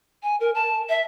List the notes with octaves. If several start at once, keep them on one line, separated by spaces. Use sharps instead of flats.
G#5
A#4
A5
E5